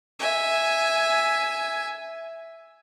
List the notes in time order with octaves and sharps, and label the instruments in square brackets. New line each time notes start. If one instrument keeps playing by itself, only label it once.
[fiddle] E5 G#5